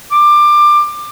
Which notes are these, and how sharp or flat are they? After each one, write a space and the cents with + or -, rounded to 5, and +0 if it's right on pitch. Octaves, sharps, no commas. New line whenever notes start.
D6 +20